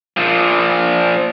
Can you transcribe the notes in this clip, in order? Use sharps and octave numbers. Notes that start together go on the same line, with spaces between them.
A#2 F3